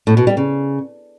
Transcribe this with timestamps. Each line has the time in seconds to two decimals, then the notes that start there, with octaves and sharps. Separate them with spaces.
0.07 A2
0.17 B2
0.27 G3
0.37 C#3